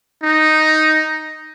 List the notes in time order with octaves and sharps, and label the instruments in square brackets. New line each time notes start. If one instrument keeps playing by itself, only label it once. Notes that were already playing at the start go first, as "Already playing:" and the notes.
[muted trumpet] D#4